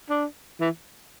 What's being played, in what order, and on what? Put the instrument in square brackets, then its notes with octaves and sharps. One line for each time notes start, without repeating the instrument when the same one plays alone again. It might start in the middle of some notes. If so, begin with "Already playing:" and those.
[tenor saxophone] D4
E3